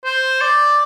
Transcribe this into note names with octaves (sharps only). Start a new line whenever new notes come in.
C5
D5